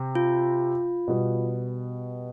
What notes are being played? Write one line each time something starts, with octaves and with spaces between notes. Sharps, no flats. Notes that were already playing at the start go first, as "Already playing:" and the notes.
Already playing: C3 C4
F4
B2 G3 B3